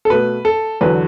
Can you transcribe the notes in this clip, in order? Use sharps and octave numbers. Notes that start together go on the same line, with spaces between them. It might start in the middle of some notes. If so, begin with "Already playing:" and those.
A4
B2 A3 B4
A4
E2 D3 F#3 B4